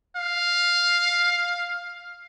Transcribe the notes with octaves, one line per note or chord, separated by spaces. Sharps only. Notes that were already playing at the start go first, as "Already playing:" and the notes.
F5